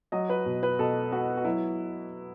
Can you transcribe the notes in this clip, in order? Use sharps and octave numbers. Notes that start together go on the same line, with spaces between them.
F#3 D#5
B4
B2
B4
B2 A4
B3 F#4
F#4
F#3 E4